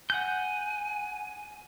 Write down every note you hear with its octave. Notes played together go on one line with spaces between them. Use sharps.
F#5 G#5 F#6 G6